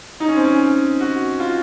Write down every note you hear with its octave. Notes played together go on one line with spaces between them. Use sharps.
D#4
C#4
C4
C#4
F#4
F4